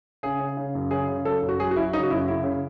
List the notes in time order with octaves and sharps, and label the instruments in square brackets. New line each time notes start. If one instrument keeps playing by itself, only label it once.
[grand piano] C#3 G#4
C#3
C#3
F#2
C#3 G#4
C#3
F#3 A4
F#2
F#4
F#3 G#4
F#4
F#3 E4
C#3 D#4
F#4
F#2 E4
C#3 E4
C#3